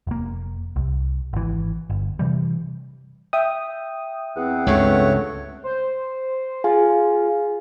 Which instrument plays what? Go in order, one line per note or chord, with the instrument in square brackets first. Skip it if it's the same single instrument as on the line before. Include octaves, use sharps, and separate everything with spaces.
[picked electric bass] F1 A#3
C2
G#1 E3
G1
C3 E3 G3
[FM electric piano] E5 G5 D#6
[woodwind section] E2 C4 F#5
[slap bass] C#2 G2 C#3 [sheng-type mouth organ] A3 C#5
[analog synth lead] C5
[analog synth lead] F4 [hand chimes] G#4 F5 G#5